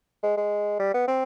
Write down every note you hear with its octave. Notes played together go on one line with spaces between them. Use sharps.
G#3
G#3
G3
B3
C4